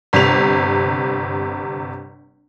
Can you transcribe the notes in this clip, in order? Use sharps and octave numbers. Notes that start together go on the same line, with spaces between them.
G1 C3 F7